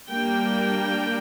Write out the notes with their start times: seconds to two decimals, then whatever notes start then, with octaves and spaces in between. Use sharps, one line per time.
0.10 G3 A#3 D4 G5